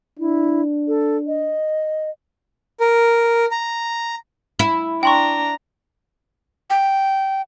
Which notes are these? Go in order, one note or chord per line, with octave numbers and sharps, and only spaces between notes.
D4 E4
A4
D#5
A#4
A#5
E4
D4 G5 A#5 C6 C#6
G5